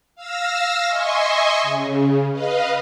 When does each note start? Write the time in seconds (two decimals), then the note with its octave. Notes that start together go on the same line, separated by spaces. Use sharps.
0.15 F5 E6 F6 A#6
0.85 D#5 E5 G#5 C6 C#6
1.63 C#3
2.32 B4 D#5 F5